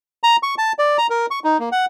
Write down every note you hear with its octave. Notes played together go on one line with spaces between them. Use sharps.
A#5
C#6
A5
D5
A#5
A#4
C#6
D#4
A#3
F#5